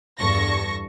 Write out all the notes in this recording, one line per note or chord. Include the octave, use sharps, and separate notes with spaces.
E2 G2 A4 C#6 A#6